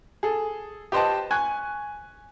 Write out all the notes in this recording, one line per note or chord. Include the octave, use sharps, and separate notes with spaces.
G#4 A4
G4 B4 C5 D#5 G5 A5
G#5 C#6 F#6 G#6